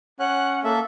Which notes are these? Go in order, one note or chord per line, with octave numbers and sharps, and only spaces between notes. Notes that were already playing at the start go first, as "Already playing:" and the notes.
C#4 F#5 F#6
A#3 A4 E5